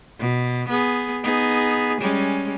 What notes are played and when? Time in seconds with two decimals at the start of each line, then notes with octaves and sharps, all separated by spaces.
0.19 B2
0.69 B3 G#4
1.23 B3 D#4 G#4
2.01 G3 G#3 C#4